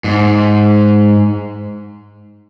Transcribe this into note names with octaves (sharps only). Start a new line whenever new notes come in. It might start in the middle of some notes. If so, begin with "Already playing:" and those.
G#2